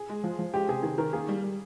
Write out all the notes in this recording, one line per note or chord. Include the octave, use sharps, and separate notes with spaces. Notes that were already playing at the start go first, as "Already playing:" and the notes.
Already playing: G#4
G#3
F3
F3
G#3 G4
C3 G#4
D#3 G#4
D#3 A#4
A#3 G#4
G3
G3